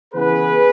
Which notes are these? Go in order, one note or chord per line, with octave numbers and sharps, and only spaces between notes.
C#3 E3 B3 E4 G#4 B4